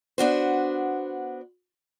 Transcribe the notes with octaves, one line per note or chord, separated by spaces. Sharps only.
B3 D4 F#4 C5